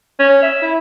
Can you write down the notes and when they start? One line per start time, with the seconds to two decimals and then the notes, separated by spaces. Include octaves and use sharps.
0.19 C#4
0.42 E5
0.62 E4